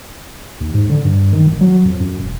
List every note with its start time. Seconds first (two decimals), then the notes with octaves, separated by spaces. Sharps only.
0.60 D#2
0.74 G#2
0.90 D3
1.05 G2
1.33 D#3
1.47 A1
1.61 F#3
1.85 F2
2.00 F#2
2.19 E1